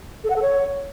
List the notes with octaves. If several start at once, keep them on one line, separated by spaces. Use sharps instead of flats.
A4
F#5
A4
C#5